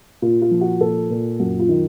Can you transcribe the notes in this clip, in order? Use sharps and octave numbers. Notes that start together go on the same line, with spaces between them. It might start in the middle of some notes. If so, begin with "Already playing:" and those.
A#2 F4
F4
F3
F#4
A#2 A4
A#2
F#2 F#4
F4
D#3